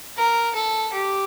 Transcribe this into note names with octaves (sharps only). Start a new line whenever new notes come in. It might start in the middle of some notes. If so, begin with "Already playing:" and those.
A#4
A4
G4